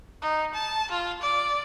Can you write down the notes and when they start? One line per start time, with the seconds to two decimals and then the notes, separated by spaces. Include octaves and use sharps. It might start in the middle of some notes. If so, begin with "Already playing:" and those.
0.22 D#4
0.54 A5
0.91 F4
1.22 D5